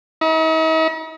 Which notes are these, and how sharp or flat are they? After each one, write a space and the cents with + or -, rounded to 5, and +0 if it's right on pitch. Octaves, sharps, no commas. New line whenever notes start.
D#4 +45